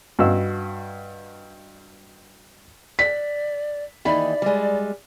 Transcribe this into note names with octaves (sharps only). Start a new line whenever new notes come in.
G2 F#4 D#5 F5 E6
D5 B6
D#2 E3 D#4 D5 B5
G3 G#3